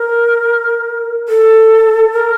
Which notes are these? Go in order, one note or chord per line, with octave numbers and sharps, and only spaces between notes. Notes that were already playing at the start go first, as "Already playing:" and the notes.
Already playing: A#4
A4
A#4